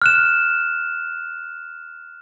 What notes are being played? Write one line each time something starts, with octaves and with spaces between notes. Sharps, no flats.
F6 F#6 E7